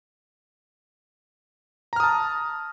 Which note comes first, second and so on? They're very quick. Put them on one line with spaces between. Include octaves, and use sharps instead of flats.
A#5 F6 D#6 A5